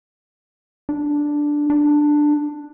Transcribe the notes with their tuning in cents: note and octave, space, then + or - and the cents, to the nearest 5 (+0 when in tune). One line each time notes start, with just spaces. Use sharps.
D4 +0
D4 +10